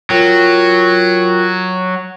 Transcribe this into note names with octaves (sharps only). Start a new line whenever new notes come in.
F#3 F4 A#4 G5